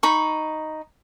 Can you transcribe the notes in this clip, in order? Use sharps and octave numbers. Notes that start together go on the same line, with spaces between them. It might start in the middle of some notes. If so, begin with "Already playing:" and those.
D#4 B5 C#6